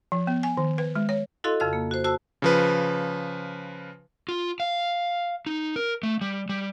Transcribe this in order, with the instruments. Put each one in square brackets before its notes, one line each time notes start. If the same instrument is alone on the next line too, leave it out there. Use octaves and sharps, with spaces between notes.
[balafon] F3
B3
G#5
D#3
B4
G#3
C#5
[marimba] E4 F#4 A4 D#5 F5 C6
F2 C#3 F5 E6
A#3
F#4 C5
F#4 C5 A5 E6
[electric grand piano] C#3 F3 B4
[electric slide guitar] F4
F5
D#4
A#4
A3
G3
G3